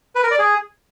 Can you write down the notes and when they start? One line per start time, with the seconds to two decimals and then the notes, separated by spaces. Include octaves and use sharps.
0.15 B4
0.23 A#4
0.31 D5
0.39 G#4